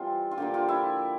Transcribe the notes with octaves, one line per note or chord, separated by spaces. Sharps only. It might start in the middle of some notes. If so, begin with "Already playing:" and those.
Already playing: E3 G3 C4 F4
F4
D3 F3 A#3 G4
F4
E4